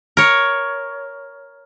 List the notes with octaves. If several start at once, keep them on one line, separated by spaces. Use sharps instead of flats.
A#4 C#5